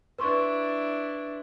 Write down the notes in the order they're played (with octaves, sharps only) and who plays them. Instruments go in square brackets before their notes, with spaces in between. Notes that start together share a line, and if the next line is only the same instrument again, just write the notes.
[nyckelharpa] D4 E4 [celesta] B4 C6 C#6